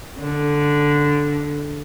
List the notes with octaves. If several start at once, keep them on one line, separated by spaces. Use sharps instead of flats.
D3